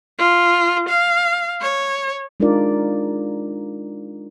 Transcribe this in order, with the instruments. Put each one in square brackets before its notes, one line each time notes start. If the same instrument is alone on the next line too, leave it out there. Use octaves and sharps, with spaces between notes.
[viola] F4
F5
C#5
[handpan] G#3 D4 D#4 F4 A#4 D5